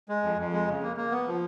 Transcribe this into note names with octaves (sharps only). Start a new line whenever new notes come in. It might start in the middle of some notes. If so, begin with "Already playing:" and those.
G#3
F2
F2
G#3
C#3
A#3
A#3
B3
F3